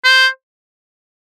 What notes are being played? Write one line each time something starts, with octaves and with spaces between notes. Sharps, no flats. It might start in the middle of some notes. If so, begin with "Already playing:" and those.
C5